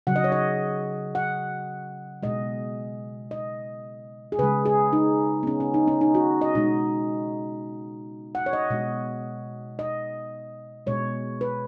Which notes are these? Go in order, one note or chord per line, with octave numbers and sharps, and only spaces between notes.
C#3 F#3 F#5
D#5
C#5
D#5
F#5
B2 G#3 D#5
D#5
G#4
C#3 G#3 B4
G#4
D#4
B3
C#4
C#4
D#4
C#4
D#4
F#4
D#5
B2 G#3 D#4
F#5
C#5
D#5
B2 G#3
D#5
B2 G#3 C#5
B4